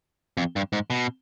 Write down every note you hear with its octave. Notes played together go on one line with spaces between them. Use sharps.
F2
G2
G#2
B2